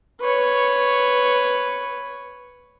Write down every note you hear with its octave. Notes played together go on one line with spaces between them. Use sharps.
B4 C#5